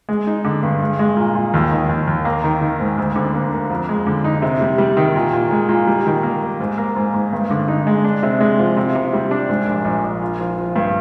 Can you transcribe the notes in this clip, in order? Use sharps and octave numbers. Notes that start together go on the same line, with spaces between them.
G#3
D#4
D3
G2
G#3
G#3
A#2
A#2
D#2
D#3
D#2
D#2
A#3
D#3
D#3
G#2
D2
D3
A#3
A#3
F2
G#3
D3
D#4
C3
G3
G3
D#3
A#2
A#2
G#3
A#2
G3
D#3
A#3
A#3
G#2
A#3
G#2
G#2
G2
D3
D#4
G#3
D4
C3
G#3
F3
C3
C3
G3
D4
G#2
A#1
A#1
A#1
F4
F3
F3
G2